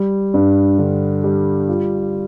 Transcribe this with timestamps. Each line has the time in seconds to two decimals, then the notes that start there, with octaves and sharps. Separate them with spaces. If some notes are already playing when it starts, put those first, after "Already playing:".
Already playing: G3
0.34 G2
0.78 D3
1.24 G3
1.68 F4